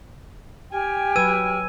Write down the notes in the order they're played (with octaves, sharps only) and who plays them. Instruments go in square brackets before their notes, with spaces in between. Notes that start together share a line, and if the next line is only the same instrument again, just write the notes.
[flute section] G4 G5 F6 [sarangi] G#5
[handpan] F#3 B4 [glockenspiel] E6 G#6 D#7